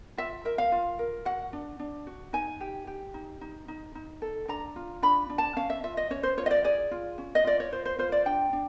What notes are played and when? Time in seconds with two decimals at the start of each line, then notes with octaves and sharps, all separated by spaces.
0.17 F4 E5
0.45 A#4 E5
0.58 F5
0.72 F4
0.99 A#4
1.25 F#4 F#5
1.53 D4
1.79 D4
2.07 F#4
2.33 D#4 G#5
2.61 G4
2.87 G4
3.14 D#4
3.41 D#4
3.68 D#4
3.95 D#4
4.22 A4
4.48 D4 A#5
4.76 F4
5.02 D4 B5
5.30 D4
5.38 A5
5.56 C#4 F5
5.70 E5
5.83 F4 E5
5.97 D#5
6.10 C#4 C#5
6.23 C5
6.37 F4 C#5
6.46 D#5
6.51 D5
6.64 G#4 D5
6.91 F4
7.18 C#4
7.35 D#5
7.45 F4 D5
7.60 C#5
7.72 F4 C5
7.85 C5
7.98 F4 C5
8.12 D5
8.26 D4 G5
8.53 D4